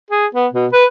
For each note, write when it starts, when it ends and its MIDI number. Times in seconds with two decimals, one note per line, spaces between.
0.11 0.26 68
0.35 0.47 59
0.53 0.67 47
0.73 0.85 71